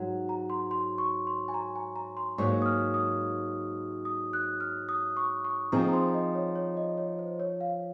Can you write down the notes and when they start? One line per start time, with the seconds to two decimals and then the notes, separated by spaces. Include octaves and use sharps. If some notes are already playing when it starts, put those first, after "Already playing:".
Already playing: G#2 F#3 F#5
0.29 A#5
0.50 C6
0.71 C6
0.98 C#6
1.27 C6
1.48 G#5
1.54 A#5
1.76 G#5
1.96 A#5
2.17 C6
2.38 G#2 F#3 A#3 C#6
2.62 D#6
2.66 F6
2.94 D#6
4.05 D#6
4.33 F#6
4.61 F6
4.89 D#6
5.17 C#6
5.45 C#6
5.72 F3 C4 D#4 G#4 A#5
5.88 A#5
5.93 C6
6.14 D#5
6.35 C#5
6.55 C#5
6.77 D#5
6.98 C#5
7.19 C5
7.40 C#5
7.61 F5